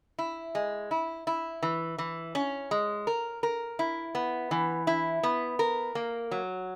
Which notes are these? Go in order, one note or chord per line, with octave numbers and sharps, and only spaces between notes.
E4
G#3
E4
E4
E3
E3
C#4
G#3
A#4
A#4
E4
B3
E3
E4
B3
A#4
A#3
F#3